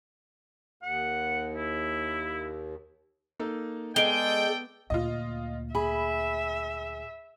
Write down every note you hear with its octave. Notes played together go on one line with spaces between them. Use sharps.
D#2 F#5
E4
A#3 D#4 A4
G#3 B3 A4 D5 G5 D7 G7
D2 A#2 F4 D#5
G#4 E5 B5